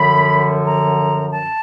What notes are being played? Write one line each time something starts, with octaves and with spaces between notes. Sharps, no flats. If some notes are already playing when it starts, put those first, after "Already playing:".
Already playing: F#2 D3 F3 B5
A#5
A5